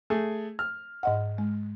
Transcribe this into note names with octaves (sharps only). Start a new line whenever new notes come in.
A3 G#4
F6
G#2 D#5 F#5
G#3